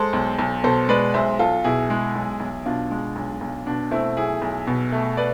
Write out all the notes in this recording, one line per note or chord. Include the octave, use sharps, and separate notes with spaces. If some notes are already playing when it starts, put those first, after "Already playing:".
Already playing: G#3 A4 C5
B1
B1
B2 A4 C5
G#3 B4 D5
B1 C5 E5
B1 F4 A4
B2 E4 G#4
G#3
B1
B1
B2 D4 F4
G#3
B1
B1
B2 D4
A3 C4 E4
B1 E4 G#4
B1
B2
A3
B4 D5